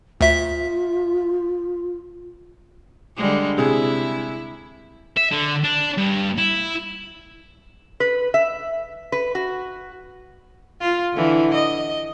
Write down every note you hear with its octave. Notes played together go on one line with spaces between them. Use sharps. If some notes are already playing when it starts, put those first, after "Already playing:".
D2 F4 E5 B6
D3 G3 G#3
C3 E4 G#4
E5
D3
D4
G2
E4
B4
E5
B4
F#4
F4
D3 E3
D#5